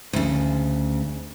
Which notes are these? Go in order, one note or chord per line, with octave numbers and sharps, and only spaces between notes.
D2 C#3